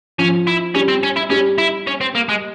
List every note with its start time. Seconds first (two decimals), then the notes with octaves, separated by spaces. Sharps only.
0.18 F3 C#4
0.47 E4
0.75 G3 C#4
0.88 C4
1.03 C#4
1.17 E4
1.30 G3 C#4
1.58 E4
1.87 C#4
2.01 C4
2.15 A#3
2.29 G#3